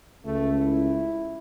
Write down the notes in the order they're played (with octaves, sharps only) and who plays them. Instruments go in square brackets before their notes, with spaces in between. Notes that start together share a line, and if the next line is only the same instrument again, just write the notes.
[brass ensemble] C#2 [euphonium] A3
[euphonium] E4